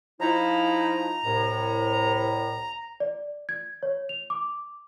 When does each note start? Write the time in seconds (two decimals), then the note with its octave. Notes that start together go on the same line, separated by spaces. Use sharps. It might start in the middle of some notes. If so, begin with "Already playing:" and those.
0.21 F3 D#4 E4 A#5
1.25 C2 A2
3.00 D5
3.49 G#6
3.83 C#5
4.09 F7
4.30 D6